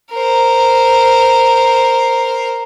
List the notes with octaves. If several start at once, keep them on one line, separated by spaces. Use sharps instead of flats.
A#4 C5